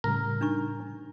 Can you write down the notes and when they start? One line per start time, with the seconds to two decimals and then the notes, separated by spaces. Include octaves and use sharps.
0.04 A2 C#3 G3 A#4
0.41 D4 D#4 C#6